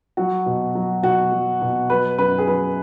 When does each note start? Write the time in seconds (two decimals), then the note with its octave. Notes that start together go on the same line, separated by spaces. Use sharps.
0.17 F#3 F#4
0.46 B2
0.75 F#3
1.03 B2 F#4
1.32 F#3
1.62 B2
1.90 F#3 B4
2.18 F#2 B4
2.38 G#4
2.47 F#3 B4